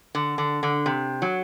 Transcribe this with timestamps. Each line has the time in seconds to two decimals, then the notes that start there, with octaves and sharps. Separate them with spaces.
0.15 D3
0.38 D3
0.63 D3
0.86 C3
1.22 F#3